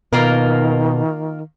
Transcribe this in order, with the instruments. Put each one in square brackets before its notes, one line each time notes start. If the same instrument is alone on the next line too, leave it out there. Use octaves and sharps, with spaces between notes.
[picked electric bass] B2 [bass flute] D#3 [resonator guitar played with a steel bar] A#3 F4 A#4